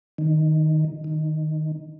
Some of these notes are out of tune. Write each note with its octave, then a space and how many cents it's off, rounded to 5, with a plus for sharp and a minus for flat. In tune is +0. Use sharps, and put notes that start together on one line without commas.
D#3 +0
D#3 -5